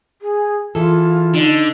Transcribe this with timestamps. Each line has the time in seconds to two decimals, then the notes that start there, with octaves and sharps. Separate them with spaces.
0.22 G#4
0.75 E3 F4 G#4 A4
1.34 D3 D#4